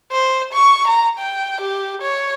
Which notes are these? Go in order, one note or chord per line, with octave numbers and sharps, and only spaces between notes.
C5
C#6
A#5
G5
G4
C#5